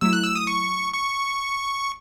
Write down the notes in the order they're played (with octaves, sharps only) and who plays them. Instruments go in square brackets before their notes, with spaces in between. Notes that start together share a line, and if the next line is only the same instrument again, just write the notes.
[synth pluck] F#3 A3 E4 [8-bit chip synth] E6
[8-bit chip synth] F#6
E6
D#6
C#6
C#6